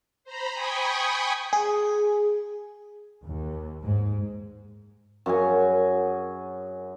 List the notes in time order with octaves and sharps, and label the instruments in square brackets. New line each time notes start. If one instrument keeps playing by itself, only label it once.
[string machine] C5 A#5 B5
G5 G#5 B5 C#6 D#6
[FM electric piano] G#4
[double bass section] D#2
G#2
[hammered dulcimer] F#2 F#4 G#4 G#5